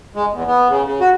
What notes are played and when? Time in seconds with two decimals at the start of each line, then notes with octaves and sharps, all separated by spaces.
0.15 G#3
0.32 E2
0.47 B3
0.69 C#3
0.84 C#3
1.00 F#4